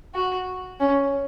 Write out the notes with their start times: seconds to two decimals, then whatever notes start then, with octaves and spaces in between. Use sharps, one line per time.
0.15 F#4
0.80 C#4